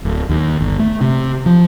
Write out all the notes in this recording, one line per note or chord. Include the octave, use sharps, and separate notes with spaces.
D1
D#2
G1
A3
C3
F3